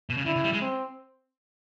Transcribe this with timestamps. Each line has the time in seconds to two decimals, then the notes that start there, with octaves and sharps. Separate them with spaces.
0.10 B2
0.17 C#3
0.26 D3 E4
0.36 C#3
0.44 G3
0.53 G#3
0.62 C4